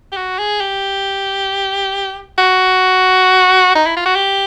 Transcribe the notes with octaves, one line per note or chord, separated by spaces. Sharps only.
G4
F#4
G#4
G4
F#4
D#4
E4
F4
F#4
G4